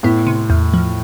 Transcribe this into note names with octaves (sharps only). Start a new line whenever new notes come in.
A2 B3
C3
E2
F3